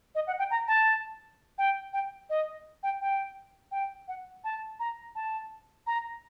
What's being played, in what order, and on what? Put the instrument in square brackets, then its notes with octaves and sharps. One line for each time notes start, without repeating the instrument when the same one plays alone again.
[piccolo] D#5
F#5
G5
A#5
A5
G5
G5
D#5
G5
G5
G5
F#5
A5
A#5
A5
A#5